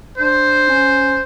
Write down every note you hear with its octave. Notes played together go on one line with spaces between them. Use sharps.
D4 C5
C#4